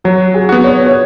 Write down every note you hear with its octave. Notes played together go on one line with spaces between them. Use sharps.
F#3 F#4
G#4
B3 F#4
C#5
C#5